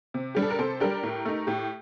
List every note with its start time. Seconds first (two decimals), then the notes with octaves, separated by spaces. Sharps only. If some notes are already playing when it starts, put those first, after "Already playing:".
0.14 C3
0.35 G3 D4 G4
0.42 A4
0.50 A#4
0.59 C3 A4 C5
0.80 G3 D4 G4 A#4
1.03 A2
1.25 A3 D#4
1.47 A2 G4